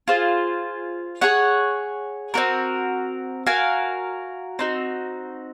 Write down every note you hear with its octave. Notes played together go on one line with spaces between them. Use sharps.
F4 G#4 C5
G#4 C#5 F#5
C4 F#4 A#4
F#4 A#4 F5 G#5
C4 D#4 F#4